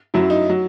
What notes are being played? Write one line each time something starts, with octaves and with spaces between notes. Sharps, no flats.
F#2 F#3 E4
D#4
F#3